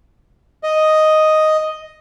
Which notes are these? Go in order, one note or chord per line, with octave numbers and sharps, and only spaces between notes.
D#5